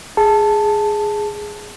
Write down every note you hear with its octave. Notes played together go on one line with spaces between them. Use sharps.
G#4 A5